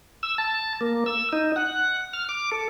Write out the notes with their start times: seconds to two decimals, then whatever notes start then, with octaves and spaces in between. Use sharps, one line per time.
0.23 E6
0.38 A5
0.81 A#3
1.06 E6
1.33 D#4
1.56 F#5
2.13 F6
2.29 D6
2.52 A4